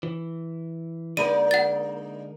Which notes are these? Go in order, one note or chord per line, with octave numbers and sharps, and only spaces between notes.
E3
D3 G#3 A#3 D#4 A#4 D5 D#7
F#5 A6